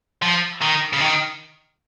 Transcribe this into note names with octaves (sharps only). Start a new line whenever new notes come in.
F3
D#3
C#3
D#3